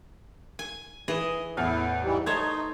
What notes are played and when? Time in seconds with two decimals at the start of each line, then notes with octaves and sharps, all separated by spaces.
0.59 G#5
1.08 E3 G#4 D#5
1.57 E2 A2 E4 F6
2.02 G#2 E3 G3
2.26 A3 D#4 C5 C#5 G#6